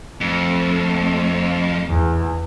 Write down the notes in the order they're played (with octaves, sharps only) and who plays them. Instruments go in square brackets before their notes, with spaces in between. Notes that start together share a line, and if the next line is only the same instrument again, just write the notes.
[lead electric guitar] F2 [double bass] A3
[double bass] E2